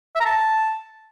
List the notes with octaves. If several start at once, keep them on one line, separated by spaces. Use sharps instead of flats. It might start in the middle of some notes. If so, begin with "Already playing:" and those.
E5
A#5
A5